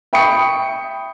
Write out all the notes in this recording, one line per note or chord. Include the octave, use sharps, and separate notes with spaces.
E5 G5 B5 C#6 D#6 C#7